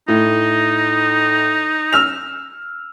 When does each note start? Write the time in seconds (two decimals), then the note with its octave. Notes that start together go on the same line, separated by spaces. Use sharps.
0.08 A2 D#4
1.93 E6 F6 F7